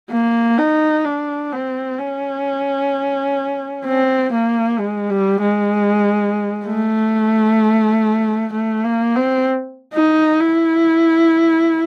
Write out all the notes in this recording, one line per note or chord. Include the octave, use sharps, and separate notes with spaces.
A#3
D#4
D4
C4
C#4
C4
A#3
G#3
G3
G#3
A3
A3
A#3
C4
D#4
E4